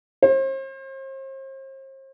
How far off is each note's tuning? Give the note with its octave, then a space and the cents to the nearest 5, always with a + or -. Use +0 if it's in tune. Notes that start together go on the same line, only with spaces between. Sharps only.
C5 +40